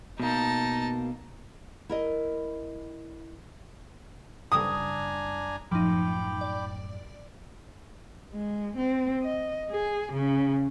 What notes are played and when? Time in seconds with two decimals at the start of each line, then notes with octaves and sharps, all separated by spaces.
0.20 B2 A#3 D#4 A5
1.89 E4 A#4 D#5
4.52 F#1 C#3 G3 D4 G#5 A#5 D#6
5.71 F#2 A2 F3 D#4 G5 B5 D6
6.41 D5
8.33 G#3
8.77 C4
9.23 D#5
9.71 G#4
10.13 C#3